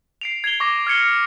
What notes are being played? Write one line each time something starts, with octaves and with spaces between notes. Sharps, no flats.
C7 D7 F7
G#6 C7 F7 G7
C#6 D6 A#6
F6 G#6 C#7 G7